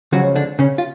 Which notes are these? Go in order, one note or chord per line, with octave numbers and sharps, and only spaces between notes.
C#2 C#3 F3 F#3 F#4
D3 D4
C#3 C#4
F4